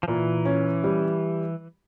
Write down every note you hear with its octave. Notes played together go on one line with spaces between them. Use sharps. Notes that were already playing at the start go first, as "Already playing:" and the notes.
F3
A#2 E3
C#4
G3